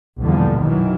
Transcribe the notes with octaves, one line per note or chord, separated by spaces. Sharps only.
A#1 E2 B2 D3 F3 G3
F#2 D#3 E3 F#3